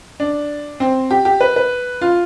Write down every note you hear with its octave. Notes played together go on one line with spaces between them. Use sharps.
D4
C4
G4
G4
B4
B4
F4